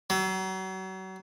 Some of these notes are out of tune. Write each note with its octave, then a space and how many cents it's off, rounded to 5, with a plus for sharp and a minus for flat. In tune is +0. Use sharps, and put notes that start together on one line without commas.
F#3 +35